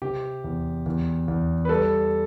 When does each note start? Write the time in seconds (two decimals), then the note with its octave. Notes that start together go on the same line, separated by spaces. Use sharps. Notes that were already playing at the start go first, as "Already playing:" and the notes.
0.02 C3 G4
0.44 E2
0.86 E2
1.28 E2
1.65 B4
1.69 G3 A4